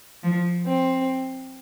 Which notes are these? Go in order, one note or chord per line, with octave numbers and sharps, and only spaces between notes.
F3
C4